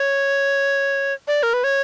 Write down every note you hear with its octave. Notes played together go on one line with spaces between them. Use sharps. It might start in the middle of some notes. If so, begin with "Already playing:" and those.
Already playing: C#5
D5
A#4
B4
C#5